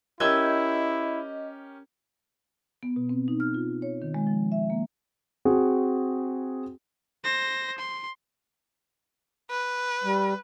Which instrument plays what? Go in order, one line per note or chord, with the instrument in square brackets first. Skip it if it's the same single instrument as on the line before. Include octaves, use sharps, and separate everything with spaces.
[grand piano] C#4 G4 A#4 [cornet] E4 [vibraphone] D#5 [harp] E6 G6 G#6
[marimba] B3
B2
C4
D#4
F6
F4
C#5
D#3
G#3
F3
E5
A#3
[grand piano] C4 F#4 G#4
[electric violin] C5 A#6
C6
[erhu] B4
[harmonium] G3